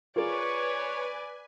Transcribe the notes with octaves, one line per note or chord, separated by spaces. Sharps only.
F4 G#4 A#4 B4 C#5 D5 G#5